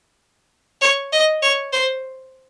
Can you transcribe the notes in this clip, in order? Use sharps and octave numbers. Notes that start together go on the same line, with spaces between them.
C#5
D#5
C#5
C5